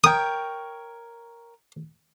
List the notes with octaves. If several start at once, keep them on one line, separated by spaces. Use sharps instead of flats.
A#4 C#5 G5 D#6